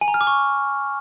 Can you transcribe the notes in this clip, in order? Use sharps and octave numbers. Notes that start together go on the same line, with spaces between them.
G#5
A#5
F6
D6
C#6